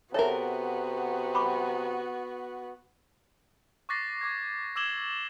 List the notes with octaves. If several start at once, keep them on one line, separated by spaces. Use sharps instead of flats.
C3 B3 F#4 A4 A#4 C#5 E5
B5 C#6 D6
C#6 D6 F#6 A6 A#6 C7
D6 G#6
D6 E6 G#6 E7 F#7 G7